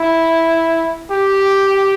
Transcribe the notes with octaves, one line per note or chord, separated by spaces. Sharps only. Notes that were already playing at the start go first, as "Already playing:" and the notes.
Already playing: E4
G4